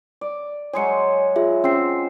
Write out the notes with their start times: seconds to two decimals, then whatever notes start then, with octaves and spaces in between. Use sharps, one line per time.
0.21 D5
0.74 F#3 G#3 G#4 C#5 C6 C#7
1.36 F4 G#4 E5
1.64 C4 C#4 F4 C7